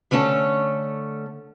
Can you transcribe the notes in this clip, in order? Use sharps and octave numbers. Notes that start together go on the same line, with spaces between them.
D3 A3 C#4 A4 C#5